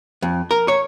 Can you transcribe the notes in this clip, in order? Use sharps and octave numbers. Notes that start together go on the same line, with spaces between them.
F2
A#4
C#5